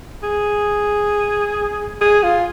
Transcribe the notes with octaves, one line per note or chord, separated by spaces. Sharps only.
G#4
G#4
F4